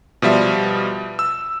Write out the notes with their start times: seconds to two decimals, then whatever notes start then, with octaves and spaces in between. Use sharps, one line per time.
0.22 B2 F3 G3 E5
1.19 E6